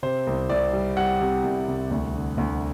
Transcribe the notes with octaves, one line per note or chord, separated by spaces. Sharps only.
C3 C5
C2
C2 D5
G3
G3 F#5
C3
C2
C2
D2
D3
D2